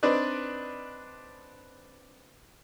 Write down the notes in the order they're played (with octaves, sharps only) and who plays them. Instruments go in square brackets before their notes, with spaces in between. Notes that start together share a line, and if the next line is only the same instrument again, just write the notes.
[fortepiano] C4 D4 D#4 B4 D5